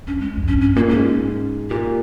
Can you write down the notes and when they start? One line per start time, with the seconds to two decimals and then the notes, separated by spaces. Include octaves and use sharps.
0.07 F2 C#4
0.21 G#3
0.27 F2
0.37 F2
0.48 G2 C#4
0.61 C#4
0.76 A#2 A#3
0.88 G#2 C#4
1.70 A#2 G4